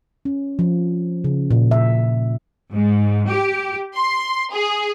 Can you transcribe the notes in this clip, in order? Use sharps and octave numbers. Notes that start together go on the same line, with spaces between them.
C#4
F3
C#3
A#2
E5
G#2
G4
C6
G#4